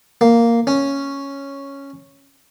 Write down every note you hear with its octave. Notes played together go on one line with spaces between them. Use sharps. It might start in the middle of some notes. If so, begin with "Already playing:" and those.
A#3
C#4